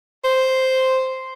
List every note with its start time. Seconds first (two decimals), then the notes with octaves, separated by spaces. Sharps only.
0.24 C5